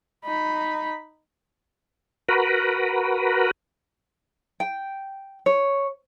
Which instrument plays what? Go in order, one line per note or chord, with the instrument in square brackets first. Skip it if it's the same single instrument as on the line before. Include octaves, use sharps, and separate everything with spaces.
[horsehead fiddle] D#4 B5
[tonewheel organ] F#4 A#4 B4
[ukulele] G5
C#5